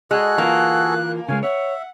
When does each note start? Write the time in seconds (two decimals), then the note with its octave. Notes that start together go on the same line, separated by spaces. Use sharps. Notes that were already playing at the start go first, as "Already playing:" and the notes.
0.11 G#3 F#4 G#4 A4 F#6
0.38 E3 A#3 F4
1.29 C#3 F3 G#3 F5 G#5
1.43 C#5 E5 F#5